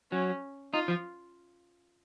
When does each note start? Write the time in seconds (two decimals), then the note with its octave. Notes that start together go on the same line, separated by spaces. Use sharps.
0.12 F#3 C#4
0.73 D#4 F4
0.88 F3